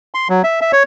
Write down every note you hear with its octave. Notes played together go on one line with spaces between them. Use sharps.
C6
F#3
E5
E5
C#5